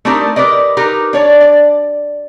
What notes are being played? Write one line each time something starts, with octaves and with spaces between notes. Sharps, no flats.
A3 C4 D4 D#4 G4 A#4
G4 A#4 B4 D5 D#5
D#4 G4 A#4 B4
D4 C#5 D5
D5